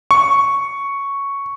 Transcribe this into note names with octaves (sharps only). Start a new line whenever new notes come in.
C#6